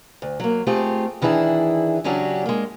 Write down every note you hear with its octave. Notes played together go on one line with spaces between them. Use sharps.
D2
F#3 A#3
A3 C4 F4 G4 G#4
D#3 E3 D4 E4 G4 G#4
C#3 F#3 C#4 D4 F#4 G4
G#3 A#3